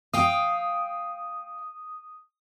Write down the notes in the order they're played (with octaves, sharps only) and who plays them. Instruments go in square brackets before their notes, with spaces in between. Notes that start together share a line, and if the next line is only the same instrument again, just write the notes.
[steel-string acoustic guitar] F5 G5 [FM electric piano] D#6